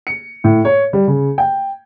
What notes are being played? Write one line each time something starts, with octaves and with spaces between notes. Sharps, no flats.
C#7
A2
C#5
G3
C#3
G5